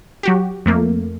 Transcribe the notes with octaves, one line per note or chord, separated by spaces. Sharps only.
F#3 F#4 G4
F2 A3 A#3